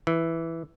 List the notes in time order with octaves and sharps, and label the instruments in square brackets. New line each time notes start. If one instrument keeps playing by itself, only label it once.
[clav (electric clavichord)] E3